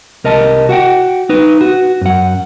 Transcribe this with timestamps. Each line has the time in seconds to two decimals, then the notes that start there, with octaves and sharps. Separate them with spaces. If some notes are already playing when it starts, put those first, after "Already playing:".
0.24 C2 A#4 D#5 A5
0.69 F#4 F#5 G5
1.29 D#4 B4
1.61 F#4
2.01 F#2 F#5